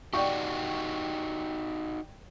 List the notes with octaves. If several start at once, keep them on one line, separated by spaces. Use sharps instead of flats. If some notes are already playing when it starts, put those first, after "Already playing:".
D#4 F#4 G4 D5 G5 C#6